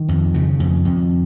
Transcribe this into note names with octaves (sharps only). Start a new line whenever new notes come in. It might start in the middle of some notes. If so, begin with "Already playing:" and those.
Already playing: D#3
F2
C#3
F2
F2